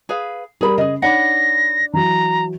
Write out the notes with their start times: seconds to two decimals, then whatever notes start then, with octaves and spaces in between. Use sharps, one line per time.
0.09 G#4 B4 F5
0.61 G3 G#4 A#4 B5
0.78 C#3 G#4 D#5
1.02 D4 D#4 C#5 F#5 B5 A#6
1.94 E3 F#3 A#5